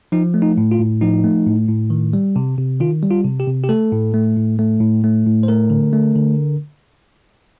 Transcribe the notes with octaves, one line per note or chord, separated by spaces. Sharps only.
F3 D#4
A3
D#4
A2
F4
A2
F3 D#4
A3
A2
A2
D#3
G3
C3
C3
D#3 F4
G3
F4
C3
G4
C3
G4
A3 A4
A2
A3
A2
A3
A2
A3
A2
C5
A3 A#4
D3
A3
D3